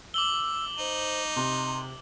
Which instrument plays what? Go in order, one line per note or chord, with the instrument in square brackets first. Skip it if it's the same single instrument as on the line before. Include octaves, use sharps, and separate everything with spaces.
[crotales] D6 F#7 G7 [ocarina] E6
[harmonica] D#4 [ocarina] C5
[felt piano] C3 [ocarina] C6